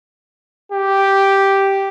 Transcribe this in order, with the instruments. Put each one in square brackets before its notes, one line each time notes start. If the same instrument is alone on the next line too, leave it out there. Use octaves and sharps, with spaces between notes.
[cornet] G4